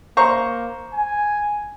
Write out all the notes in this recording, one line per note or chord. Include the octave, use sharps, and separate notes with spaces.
A#3 C5 A#5 C#6
G#5